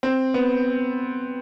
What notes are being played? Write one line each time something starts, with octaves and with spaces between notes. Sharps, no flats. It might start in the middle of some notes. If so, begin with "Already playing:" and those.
C4
B3